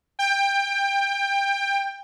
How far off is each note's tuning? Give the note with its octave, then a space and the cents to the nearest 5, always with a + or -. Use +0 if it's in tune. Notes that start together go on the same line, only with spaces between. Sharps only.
G5 +20